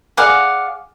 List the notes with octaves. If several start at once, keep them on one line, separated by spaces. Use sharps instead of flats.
G#4 D5 F5 F#5